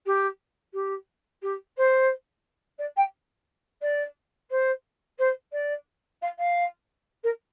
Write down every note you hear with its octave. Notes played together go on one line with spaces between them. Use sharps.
G4
G4
G4
C5
D5
G5
D5
C5
C5
D5
F5
F5
A#4